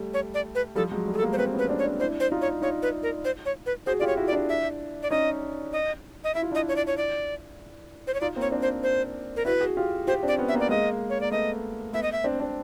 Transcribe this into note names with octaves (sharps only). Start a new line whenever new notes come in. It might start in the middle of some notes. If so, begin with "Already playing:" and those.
Already playing: G3 A3
C#5
D5
B4
F3 G3 A4
F#3 G#3
G3 A3
G#4
A4
G#3 A#3
C5
A#3 C4 B4
B3 C#4
B4
C4 D4
C#5
C4 D4
D4 E4 C5
C5
D#4 F4
C#5
D#4 F4 C#5
B4
A#4
C5
C#5
B4
F#4 G#4 C5
F4 G4 D5
C#5
E4 F#4
D5
D4 E4
E5
D5
C#4 D#4 D#5
D#5
D#5
E4 E5
F4
D4 E4 D#5
C#5
D5
C#5
D5
C5
C#5
D#4 F4 D5
A#3 C4
C#5
C4 D4
C5
C5
A#4
E4 F#4 B4
F#4 G#4
F4 G4
F4 G4 C5
C4 D4
D5
B3 C#4
E5
A#3 C4
D5
G#3 A#3 D#5
C#5
A#3 D5
A3 B3 D#5
A3 B3 E5
D#5
E5
C4 D4
C4 D4